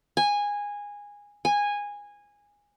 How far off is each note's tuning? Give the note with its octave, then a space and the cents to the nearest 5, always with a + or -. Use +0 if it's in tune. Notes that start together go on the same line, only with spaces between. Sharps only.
G#5 -15
G#5 -15